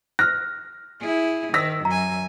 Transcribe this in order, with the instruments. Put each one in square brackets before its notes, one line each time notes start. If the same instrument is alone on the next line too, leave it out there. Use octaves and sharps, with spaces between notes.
[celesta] F6 F#6 [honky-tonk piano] A#6
[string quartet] E4 G#4
[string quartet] D#3 [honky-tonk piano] E6 A#6 B6
[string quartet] F#2 G#5 [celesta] A#5